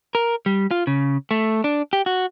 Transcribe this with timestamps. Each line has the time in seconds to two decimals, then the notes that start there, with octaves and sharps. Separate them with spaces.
0.15 A#4
0.46 G3
0.71 F4
0.87 C#3
1.31 A3
1.64 D4
1.93 G4
2.06 F#4